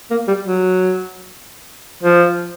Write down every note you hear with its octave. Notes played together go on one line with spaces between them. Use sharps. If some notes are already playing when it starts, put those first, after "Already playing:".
A#3
G3
F#3
F3